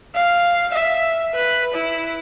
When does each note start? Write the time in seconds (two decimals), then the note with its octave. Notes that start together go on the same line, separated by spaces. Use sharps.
0.15 F5
0.74 E5
1.35 B4
1.74 E4